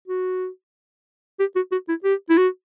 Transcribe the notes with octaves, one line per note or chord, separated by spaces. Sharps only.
F#4
G4
F#4
F#4
E4
G4
E4
F#4